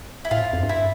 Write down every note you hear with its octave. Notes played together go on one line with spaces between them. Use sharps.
E4
A2 F4
G2
F2
G2
E4